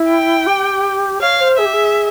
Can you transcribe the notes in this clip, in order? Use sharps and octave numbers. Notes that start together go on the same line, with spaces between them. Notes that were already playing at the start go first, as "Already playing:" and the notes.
Already playing: E4
G5
G4
C#5 F5
C5
G#4 E5
G4
G#4